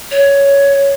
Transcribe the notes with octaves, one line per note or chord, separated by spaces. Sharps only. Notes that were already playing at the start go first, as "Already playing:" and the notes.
C#5